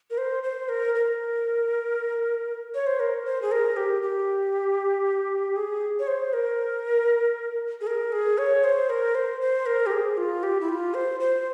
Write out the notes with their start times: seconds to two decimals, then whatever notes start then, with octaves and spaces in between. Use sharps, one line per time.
0.10 A#4
0.18 C5
0.43 C5
0.69 A#4
0.95 A#4
2.75 C#5
2.87 C5
3.00 A#4
3.25 C5
3.42 G#4
3.52 A#4
3.76 G4
4.02 G4
5.56 G#4
5.99 C#5
6.07 C5
6.33 A#4
7.81 G#4
7.87 A#4
8.12 G#4
8.38 C#5
8.64 C5
8.90 A#4
9.15 C5
9.41 C5
9.66 A#4
9.86 G4
9.92 G#4
10.17 F4
10.43 G4
10.61 E4
10.69 F4
10.94 C5
11.20 C5